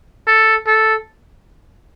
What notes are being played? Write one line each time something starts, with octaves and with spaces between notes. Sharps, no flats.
A4
A4